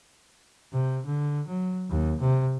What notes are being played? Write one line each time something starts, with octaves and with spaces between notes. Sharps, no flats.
C3
D3
F#3
D#2
C3